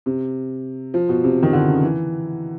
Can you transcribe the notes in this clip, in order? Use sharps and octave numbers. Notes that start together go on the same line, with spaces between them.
C3
F3
B2
C3
D#3
D3
C#3
E3